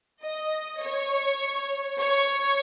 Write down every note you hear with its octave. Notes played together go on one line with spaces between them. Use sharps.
D#5
C#5
C#5